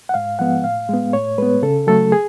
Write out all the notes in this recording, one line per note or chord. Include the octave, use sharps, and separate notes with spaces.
F#5
G#2 F5
F3 G#3 B3 F#5
A2 F5
G#3 B3
A2 C#5
G#3 B3 B4
C#3 A4
F#3 A3 A4
G#4